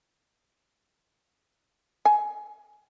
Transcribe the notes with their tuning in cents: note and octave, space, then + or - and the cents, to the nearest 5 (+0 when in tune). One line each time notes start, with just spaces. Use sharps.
G#5 +15